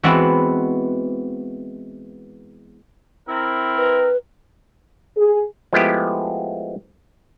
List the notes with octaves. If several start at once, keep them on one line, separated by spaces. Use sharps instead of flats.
E3 G#3 B3 C4 E4 F#4
C4 E4 A#4
B4
G#4
F3 G#3 A3 B3 E4 G4